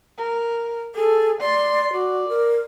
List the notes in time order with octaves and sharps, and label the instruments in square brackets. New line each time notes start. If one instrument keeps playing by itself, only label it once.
[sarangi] A#4
[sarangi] G#4 [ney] A4
[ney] D5 [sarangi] C6
[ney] F#4 [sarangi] D5
[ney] A#4